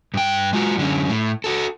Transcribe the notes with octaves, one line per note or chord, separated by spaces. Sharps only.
G2 G5
G#3 F4 F#4
F#2 D3 C#4
A2
F#4 A4